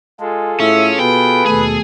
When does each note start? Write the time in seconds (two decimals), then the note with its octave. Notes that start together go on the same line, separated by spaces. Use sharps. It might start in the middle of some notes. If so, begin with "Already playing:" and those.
0.20 G#3 F4 G#4 A4
0.60 A2 C#4 E5
0.99 B2 B4 G5
1.46 D#2 B2 A3 G#4 A4